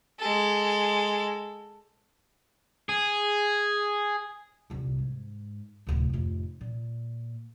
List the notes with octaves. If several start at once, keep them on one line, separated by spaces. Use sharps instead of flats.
G#3 A4
G#4
D#1 C2
G#2
D1 C3
F1 A2
A#2